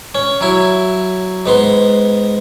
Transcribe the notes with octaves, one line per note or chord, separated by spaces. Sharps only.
C#4
F#3 E4
G#2 B3 C6